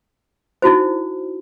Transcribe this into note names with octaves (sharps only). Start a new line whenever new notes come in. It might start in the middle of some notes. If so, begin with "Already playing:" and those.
D#4 E4 F#4 C5